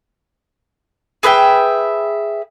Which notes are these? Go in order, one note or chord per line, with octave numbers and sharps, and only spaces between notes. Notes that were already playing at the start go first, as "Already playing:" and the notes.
G#4 B4 E5 G5